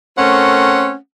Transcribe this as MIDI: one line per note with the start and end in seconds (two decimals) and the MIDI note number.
0.17 0.94 57
0.17 0.94 60
0.17 0.94 61
0.17 0.94 70
0.17 0.94 78